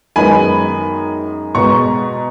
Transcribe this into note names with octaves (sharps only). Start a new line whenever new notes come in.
F#2 D#3 G#3 B3 G#5 B5
B2 G#3 B3 A#5 C#6